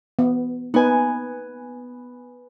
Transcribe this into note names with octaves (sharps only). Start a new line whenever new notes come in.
B3
B3 D#4 B4 G#5